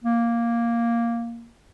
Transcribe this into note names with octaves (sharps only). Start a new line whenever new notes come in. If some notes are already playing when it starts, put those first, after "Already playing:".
A#3